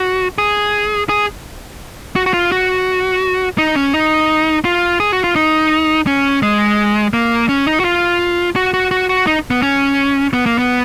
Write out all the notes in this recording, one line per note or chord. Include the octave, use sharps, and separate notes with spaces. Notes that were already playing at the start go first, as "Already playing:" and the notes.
Already playing: F#4
G#4
G#4
F#4
F#4
F4
F#4
D#4
C#4
D#4
F4
G#4
F#4
F4
D#4
C#4
G#3
A#3
C#4
D#4
F#4
F4
F#4
F#4
F#4
F#4
D#4
B3
C#4
B3
A#3
B3